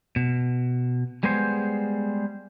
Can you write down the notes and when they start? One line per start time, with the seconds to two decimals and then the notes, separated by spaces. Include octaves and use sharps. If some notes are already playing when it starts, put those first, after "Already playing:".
0.16 B2
1.23 G3 G#3 B3 G#4 C5